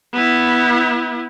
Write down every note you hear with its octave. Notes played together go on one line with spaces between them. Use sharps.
B3 E4